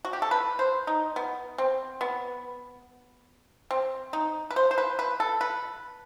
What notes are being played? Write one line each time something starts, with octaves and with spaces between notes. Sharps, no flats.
F#4
G4
A4
B4
C5
D#4
B3
C4
B3
C4
D#4
B4
C5
C5
B4
B4
A4
B4